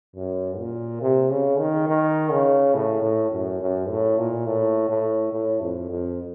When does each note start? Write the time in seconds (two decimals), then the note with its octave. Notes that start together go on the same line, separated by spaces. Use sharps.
0.16 F#2
0.58 A#2
1.01 C3
1.30 C#3
1.59 D#3
1.88 D#3
2.31 C#3
2.74 A2
3.02 A2
3.31 F#2
3.60 F#2
3.89 A2
4.18 A#2
4.46 A2
4.89 A2
5.32 A2
5.61 F2
5.90 F2